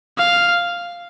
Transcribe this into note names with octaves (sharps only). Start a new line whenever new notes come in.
F5